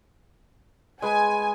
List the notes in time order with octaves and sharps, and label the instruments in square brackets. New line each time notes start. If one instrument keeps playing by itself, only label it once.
[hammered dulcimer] G#3 B4 [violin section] G#5